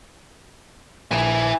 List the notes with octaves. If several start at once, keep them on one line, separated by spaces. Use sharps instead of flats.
A#1 E4 G#5